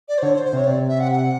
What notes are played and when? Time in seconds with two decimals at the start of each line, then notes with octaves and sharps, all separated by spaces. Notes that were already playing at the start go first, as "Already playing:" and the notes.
0.08 D5
0.18 C5
0.23 D3 C#5
0.34 C5
0.45 C5
0.53 C3 C#5
0.67 C3 D5
0.89 E5
1.00 F#5
1.12 F#5